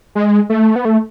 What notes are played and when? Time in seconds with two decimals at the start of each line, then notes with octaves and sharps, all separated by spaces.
0.15 G#3
0.50 A3
0.76 B3
0.85 A3